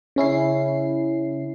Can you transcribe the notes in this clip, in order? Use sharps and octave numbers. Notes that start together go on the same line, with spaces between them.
C#3 C#4 E4 C7